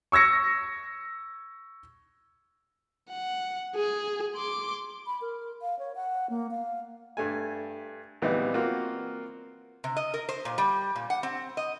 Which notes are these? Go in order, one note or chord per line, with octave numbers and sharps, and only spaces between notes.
C#6 E6 G#6 A#6 C#7
F#5
G#4
C6 D6
B5
A#4
F5
C#5
F#5
A#3
F5
G2 A3 G#5
A#1 E3 G3 B3 C4 D#4
A#3 C4 F4 F#4
C3
D#5
A#4
C5
A#2
G3
A#2
F#5
C4
D#5